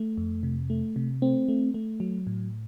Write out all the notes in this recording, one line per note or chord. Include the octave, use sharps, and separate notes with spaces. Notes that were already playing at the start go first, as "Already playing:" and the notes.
Already playing: A3
F2
C3
A3
C3
A3 C4
A3
A3
F#3
A2